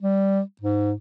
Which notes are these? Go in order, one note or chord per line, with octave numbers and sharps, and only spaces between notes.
G3
G#2